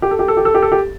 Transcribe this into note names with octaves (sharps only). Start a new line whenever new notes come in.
G4
A4
G4
A4
G4
A4
G4
A4
G4